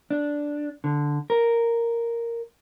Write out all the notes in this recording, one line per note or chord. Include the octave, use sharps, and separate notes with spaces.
D4
D3
A#4